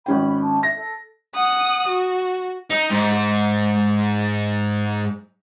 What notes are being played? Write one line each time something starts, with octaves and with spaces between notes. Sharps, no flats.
G#1 C#4 G5 B5
A5
E5 A#6
A4
F#5 D#6
F#4
D#4
G#2